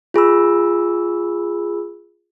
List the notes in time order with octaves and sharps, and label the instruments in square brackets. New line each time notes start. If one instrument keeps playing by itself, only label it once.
[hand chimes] F4 G#4 B5 E6